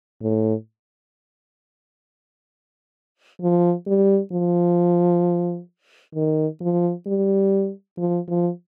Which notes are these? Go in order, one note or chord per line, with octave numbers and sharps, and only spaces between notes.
A2
F3
G3
F3
D#3
F3
G3
F3
F3